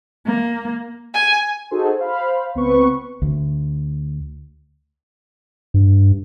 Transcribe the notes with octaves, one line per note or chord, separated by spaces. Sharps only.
A#3
G#5
D#4 F#4 G#4 A4 C5
C5 F5 B5
C#2 B3 C4 B4 C#6
D2
G2